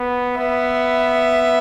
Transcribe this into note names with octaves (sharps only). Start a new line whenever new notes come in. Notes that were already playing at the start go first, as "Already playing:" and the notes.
Already playing: B3
B3 E5